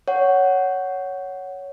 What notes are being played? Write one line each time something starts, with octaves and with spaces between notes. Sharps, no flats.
C#5 F#5